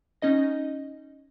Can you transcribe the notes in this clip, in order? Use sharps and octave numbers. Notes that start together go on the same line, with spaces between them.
C#4 D#4 D#5 A#6